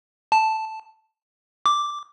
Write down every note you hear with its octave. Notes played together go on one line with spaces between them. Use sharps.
A5
D6